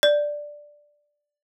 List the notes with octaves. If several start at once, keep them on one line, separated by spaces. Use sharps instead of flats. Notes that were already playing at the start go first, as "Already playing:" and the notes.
D5